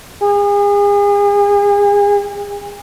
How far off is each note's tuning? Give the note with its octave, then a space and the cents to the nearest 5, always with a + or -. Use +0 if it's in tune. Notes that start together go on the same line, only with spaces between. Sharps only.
G#4 -35